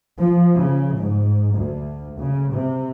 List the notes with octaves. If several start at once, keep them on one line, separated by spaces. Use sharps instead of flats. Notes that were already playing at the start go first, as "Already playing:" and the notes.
F3
C#3
G#2
D2
C#3
C3